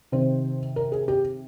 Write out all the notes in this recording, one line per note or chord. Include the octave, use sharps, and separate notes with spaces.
C3 D#3 C5
A#4
G#4
G4